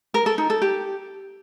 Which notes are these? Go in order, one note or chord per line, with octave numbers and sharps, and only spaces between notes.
A#4
A4
D#4
A4
G4